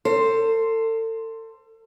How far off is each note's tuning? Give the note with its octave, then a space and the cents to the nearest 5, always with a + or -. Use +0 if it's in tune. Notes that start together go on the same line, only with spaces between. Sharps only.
A4 +35 C5 +0